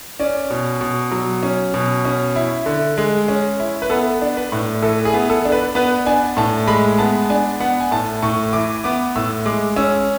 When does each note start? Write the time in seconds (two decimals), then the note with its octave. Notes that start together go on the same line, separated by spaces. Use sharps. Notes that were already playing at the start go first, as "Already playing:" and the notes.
0.19 C#4 D5
0.50 B2
0.81 B2
1.11 F#3
1.43 C#4
1.74 B2
2.05 C#4
2.36 E4
2.66 D3
2.98 G#3
3.28 C#4
3.60 E4
3.82 B4
3.90 B3 A4
4.22 D4
4.37 B4
4.52 A2
4.82 E3 A4
5.05 G#4
5.14 B3
5.30 A4
5.45 D4
5.52 B4
5.75 B3 B4
6.06 D4 G#5
6.37 A2 A5
6.68 G#3 B5
6.98 B3 A5
7.30 D4 G#5
7.61 B3 F#5
7.80 G#5
7.91 A2 A5
8.22 A2 C#6
8.53 E3 D6
8.84 B3 D6
9.15 A2 E6
9.46 G#3 D6
9.76 C#4 E6